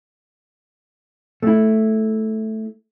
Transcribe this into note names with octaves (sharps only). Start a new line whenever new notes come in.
A3 E4